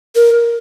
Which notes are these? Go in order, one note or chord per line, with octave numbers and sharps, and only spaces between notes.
A#4